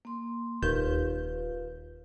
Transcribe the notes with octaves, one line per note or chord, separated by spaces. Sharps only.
A#3 C6
D#1 D#2 F4 B4 F5 G6